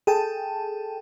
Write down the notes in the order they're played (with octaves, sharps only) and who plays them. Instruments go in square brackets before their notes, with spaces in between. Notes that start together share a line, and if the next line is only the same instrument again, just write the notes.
[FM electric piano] G#4 A4 G5 A5